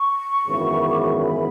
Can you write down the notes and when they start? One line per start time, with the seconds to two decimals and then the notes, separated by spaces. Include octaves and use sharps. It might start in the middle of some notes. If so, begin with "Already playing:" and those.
Already playing: C#6
0.47 G#1 F#2 C#3 E3 B3
0.90 D6
1.03 C#6
1.16 B5